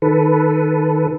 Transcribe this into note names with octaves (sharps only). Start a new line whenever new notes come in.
D#3 A4 B4